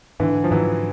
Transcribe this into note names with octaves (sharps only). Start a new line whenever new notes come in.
G#2 D3 E3
F3
G#2 E3 F#3